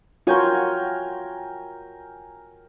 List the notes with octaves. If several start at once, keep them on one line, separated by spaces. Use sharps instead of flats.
F4 F#4 A#4 C#5 G5 G#5